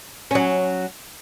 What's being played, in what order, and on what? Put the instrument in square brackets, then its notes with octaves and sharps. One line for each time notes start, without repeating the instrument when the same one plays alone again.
[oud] F#3 C#4